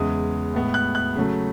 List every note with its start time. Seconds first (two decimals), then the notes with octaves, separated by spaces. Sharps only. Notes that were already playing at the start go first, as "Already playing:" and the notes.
Already playing: E2 C#3 G#3 D#6
0.54 A2 G#3 B3
0.74 F#6
0.95 F#6
1.15 C#3 F#3 A3